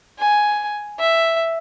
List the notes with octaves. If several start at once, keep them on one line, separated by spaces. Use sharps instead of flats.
G#5
E5